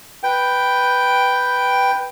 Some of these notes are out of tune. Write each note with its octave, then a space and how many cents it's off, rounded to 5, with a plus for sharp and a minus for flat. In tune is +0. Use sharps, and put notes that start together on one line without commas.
B4 +0 G5 +0